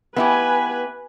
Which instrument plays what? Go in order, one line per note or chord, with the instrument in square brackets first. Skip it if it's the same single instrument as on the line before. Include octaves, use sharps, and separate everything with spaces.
[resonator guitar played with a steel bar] B3 E4 G4 [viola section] B4 G#5